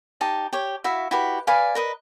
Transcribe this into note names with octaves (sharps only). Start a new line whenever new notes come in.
D#4 G4 A5
G4 C#5
E4 F#4 E5 F5
E4 F#4 G4 B4
B4 D5 F5 G#5
A#4 B4 D#5